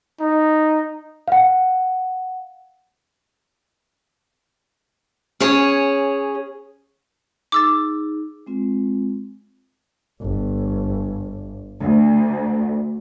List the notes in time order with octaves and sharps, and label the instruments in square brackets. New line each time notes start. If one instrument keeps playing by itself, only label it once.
[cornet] D#4
[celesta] F5 F#5
[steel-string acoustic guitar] C#4 G#4 C#5
[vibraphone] D#4 G#4 [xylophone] D6 E6 A6
[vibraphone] G#3 C4 F4
[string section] G1
D2